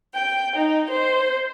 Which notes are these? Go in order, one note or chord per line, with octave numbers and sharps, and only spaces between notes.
G5
D#4
C5